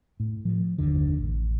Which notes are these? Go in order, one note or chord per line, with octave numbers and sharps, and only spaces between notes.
A2
F3
F#1 D#2 D3
A1